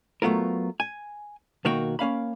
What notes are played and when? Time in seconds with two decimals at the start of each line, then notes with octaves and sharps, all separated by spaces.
0.22 F#3 A3 B3 F4 A#4
0.80 G#5
1.65 B1 D#3 A#3 F#4 G5
1.99 A#3 C#4 F5 B5